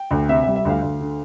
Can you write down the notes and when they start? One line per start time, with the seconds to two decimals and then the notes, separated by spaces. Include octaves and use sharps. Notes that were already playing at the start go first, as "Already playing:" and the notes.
Already playing: G5
0.11 D2
0.29 C3 E5
0.43 E5
0.47 G3
0.56 E5
0.65 D2 F5
0.82 D2
1.01 D3